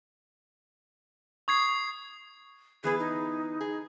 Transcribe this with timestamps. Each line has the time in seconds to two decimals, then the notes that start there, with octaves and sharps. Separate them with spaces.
1.48 C#6 D#6 G#6 C7
2.84 E3 B3 G#4 B4
2.99 D#4
3.61 G#4